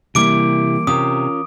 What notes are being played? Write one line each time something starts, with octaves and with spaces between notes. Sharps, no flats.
C3 E3 G3 A#3 E4 G4 D6 D7
C3 C#4 F4 A#4 D#6